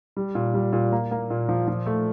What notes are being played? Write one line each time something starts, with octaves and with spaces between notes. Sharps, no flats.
G3
A#2
G3
A#2
A#3
A#3
A#2
F3
F3
A3